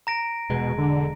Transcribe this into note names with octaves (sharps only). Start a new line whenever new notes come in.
A#5 A#6 D7
E1 B2 G#3
D3